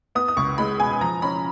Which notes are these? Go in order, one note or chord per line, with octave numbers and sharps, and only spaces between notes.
B3 D#6
D#6
C#2 C#6
G#3 B5
B2 G#5
F3 A#5
C#4 B5